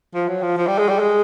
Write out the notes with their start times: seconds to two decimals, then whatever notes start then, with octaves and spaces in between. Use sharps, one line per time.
0.14 F3
0.28 F#3
0.42 F3
0.57 F3
0.67 G3
0.78 G#3
0.89 G3
0.99 G#3